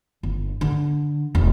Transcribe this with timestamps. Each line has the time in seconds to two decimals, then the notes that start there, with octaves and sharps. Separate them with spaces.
0.23 G1
0.61 D3
1.35 E1